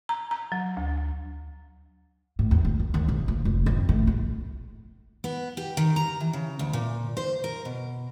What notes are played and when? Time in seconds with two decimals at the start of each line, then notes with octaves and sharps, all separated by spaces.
0.09 A#5
0.31 A#5
0.52 F#3
0.77 D2
2.39 A2
2.51 E2
2.65 D1
2.80 F#2
2.94 D#2
3.08 A#1
3.28 A#2
3.45 F1
3.66 F2
3.89 A2
4.07 A#1
5.24 B3
5.57 G4
5.77 D#3
5.96 A#5
6.20 E3
6.33 C#3
6.59 D2
6.73 A#2
7.17 C5
7.44 A#4
7.65 B2